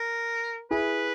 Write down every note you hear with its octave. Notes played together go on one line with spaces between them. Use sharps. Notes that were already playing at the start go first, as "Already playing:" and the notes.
Already playing: A#4
E4 G#4 B4